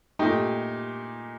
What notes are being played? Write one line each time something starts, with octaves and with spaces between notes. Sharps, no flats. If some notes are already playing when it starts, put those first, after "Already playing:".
A#2 A3 D#4 G4